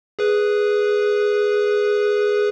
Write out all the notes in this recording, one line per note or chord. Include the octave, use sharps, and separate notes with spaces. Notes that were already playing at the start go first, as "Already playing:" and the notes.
G#4 B4